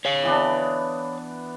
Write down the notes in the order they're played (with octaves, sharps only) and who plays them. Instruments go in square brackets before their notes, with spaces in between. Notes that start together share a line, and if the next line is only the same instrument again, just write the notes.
[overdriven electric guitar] C#5 F5
[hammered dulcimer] E3 B3 D4